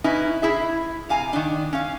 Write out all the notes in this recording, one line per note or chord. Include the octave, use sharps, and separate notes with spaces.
C#4 D#4 E4 B4
E4 G#4 E5
C3 F5 G#5 A#5
D#3 D4
C#4 F5